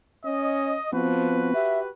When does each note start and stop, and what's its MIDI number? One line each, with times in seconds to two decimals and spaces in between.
0.25 0.75 61
0.25 0.88 75
0.92 1.50 53
0.92 1.54 59
0.92 1.54 60
0.92 1.90 66
0.92 1.90 71
1.54 1.88 67
1.54 1.79 76